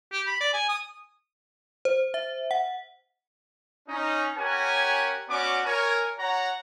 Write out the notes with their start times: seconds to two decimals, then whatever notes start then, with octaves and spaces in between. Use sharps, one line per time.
0.12 G4
0.27 B5
0.40 D5
0.53 G#5
0.69 D#6
1.85 C5
2.14 E5
2.51 F#5
3.88 C#4 D#4
4.37 C#4 G4 A#4 C#5 F#5 G#5
5.29 B3 C#4 F#4 D5 C#6 D6
5.65 A#4 C#5 G#5
6.18 F#4 C#5 F#5 A#5